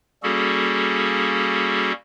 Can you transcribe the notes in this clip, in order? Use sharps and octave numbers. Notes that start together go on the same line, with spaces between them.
G3 A#3 C#4 F#4 G#4 A4